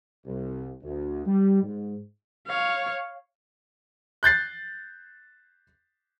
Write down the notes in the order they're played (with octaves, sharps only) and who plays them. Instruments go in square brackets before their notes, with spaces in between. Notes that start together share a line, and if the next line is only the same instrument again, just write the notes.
[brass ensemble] C2
D2
G3
G#2
[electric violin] C#5 F5
[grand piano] F#6 G6 A6 C7